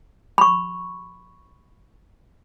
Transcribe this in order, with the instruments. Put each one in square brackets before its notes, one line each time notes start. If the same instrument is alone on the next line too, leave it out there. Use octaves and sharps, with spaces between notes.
[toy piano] B5 C#6